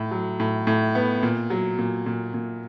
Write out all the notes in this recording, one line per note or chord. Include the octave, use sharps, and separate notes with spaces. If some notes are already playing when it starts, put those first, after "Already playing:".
Already playing: A2
F#3
A2
A2
B3
A#2
F#3
A#2
A#2
A#2